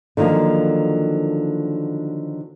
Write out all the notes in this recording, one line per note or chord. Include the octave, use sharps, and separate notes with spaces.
D3 D#3 F3 F#3 A#3